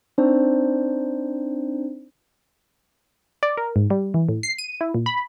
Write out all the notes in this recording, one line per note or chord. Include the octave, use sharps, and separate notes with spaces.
C4 D4 D#4 C5 D5
D5
A#4
G#2
G3
E3
A2
C7
D#7
E4
A#2
B5